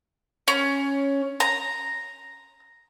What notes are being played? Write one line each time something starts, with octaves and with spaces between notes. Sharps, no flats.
C#4
A#5